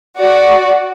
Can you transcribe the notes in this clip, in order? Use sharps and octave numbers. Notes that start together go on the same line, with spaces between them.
F#4 D5